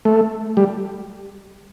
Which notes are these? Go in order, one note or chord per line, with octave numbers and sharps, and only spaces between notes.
A3
G3